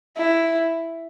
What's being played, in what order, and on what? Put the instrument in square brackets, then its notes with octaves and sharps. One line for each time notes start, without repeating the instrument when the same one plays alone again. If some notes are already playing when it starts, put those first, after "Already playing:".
[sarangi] E4